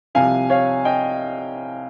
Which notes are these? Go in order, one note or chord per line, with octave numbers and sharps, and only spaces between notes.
C2 C3 F3 F5 G#5
C#5 F5
D#5 G5